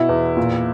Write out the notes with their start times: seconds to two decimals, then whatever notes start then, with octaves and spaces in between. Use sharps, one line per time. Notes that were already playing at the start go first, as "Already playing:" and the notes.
Already playing: B2 E4
0.09 E2
0.37 A#2